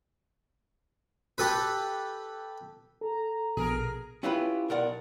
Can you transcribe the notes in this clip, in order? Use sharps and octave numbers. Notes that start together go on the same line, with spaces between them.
G4 A4 B4
A4 A#5
A#1 B2 G#4 A#4
C#4 E4 F4 G4 B4 B5
B1 A#4 D5 F#5